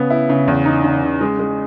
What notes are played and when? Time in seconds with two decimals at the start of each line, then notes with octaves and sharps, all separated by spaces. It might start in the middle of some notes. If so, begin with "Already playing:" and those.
Already playing: C#3 B3
0.10 E4
0.29 C#3
0.48 E2
0.65 D#4
0.84 C#3
1.03 C#3
1.21 G#3
1.39 G#3